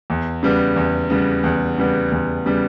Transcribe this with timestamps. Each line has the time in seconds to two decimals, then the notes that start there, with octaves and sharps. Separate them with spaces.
0.10 E2
0.43 C#3 G3 B3
0.76 E2
1.10 C#3 G3 B3
1.44 E2
1.78 C#3 G3 B3
2.12 E2
2.46 C#3 G3 B3